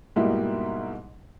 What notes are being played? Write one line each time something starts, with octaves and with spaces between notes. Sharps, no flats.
G#2 B2 G3 A#3 D#4 E4